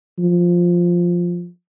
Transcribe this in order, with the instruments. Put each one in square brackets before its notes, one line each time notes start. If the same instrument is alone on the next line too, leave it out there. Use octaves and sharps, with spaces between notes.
[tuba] F3